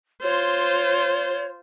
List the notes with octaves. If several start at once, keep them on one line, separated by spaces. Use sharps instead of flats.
F4 C5 C#5